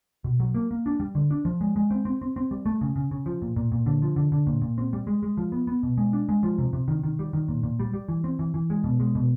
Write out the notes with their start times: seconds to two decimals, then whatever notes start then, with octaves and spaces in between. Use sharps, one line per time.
0.24 B2
0.40 F#3
0.54 A#3
0.71 A#3
0.86 D4
1.00 G3
1.15 D3
1.31 D4
1.45 F3
1.61 G#3
1.76 G#3
1.91 C4
2.05 C4
2.22 C4
2.36 C4
2.51 G3
2.66 A3
2.81 C#3
2.96 C#3
3.11 C#3
3.26 F3
3.42 A#2
3.56 A#2
3.72 A#2
3.86 D3
4.02 F3
4.16 D3
4.32 D3
4.47 A#2
4.62 A#2
4.78 C4
4.93 G3
5.07 G#3
5.23 G#3
5.37 F3
5.52 B3
5.67 B3
5.83 B2
5.98 G#3
6.13 D4
6.29 G#3
6.43 F3
6.58 C3
6.73 C3
6.88 D#3
7.03 D#3
7.19 G3
7.33 D#3
7.48 A#2
7.63 A#2
7.80 G3
7.94 G3
8.08 E3
8.24 C4
8.39 E3
8.54 E3
8.70 G#3
8.84 B2
9.00 G#3
9.15 B2